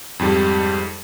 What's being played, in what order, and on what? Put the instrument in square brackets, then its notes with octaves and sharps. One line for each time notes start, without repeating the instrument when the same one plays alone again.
[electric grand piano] F2 G#2 G3